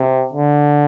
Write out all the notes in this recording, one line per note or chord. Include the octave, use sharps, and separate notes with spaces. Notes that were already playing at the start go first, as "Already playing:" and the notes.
Already playing: C3
D3